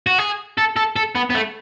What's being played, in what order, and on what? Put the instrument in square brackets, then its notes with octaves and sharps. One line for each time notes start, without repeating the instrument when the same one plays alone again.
[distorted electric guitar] F#4
G#4
A4
A4
A4
B3
B3
A3